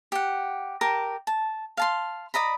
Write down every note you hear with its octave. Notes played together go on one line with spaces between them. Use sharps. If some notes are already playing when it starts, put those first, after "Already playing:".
G4 F#5
G4 A#4 A5
A5
F5 A5 C6
D5 D#5 A#5 B5